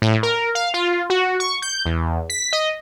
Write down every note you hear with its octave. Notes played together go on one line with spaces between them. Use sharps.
A2
A#4
F5
F4
F#4
C#6
G6
E2
B6
D#5